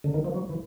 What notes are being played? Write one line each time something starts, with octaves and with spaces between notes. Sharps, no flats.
D3
D#3
F3
F#3
E3